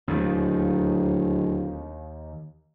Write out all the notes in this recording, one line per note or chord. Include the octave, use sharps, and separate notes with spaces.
D1 D#2 D#3